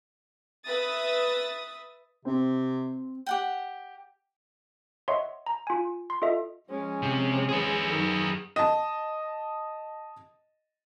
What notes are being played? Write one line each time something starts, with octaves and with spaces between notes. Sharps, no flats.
B4 E5 D#6 A6
C3 C4
G4 F#5 G5
C#5 D#5 E5 F#5 C6 C#6
A#5
F4 G#5
C6
F4 A4 D#5 E5
F3 G#3 C#4
C3
G#4 B4
F#2 D#3
D#5 A5